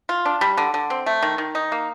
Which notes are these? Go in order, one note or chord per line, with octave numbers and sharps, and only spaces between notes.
F4
D4
G3
D3
D3
C4
A3
D#3
D#3
D#4
A#3